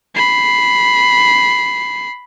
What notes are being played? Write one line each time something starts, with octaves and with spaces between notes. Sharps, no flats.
B5 C7